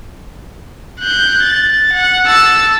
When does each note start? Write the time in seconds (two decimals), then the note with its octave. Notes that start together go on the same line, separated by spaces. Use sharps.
1.00 F#6 G6
1.43 A6
1.92 F#5
2.27 A5 E6